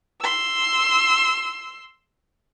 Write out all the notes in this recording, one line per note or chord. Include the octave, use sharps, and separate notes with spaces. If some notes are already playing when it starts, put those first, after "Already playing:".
C6 E6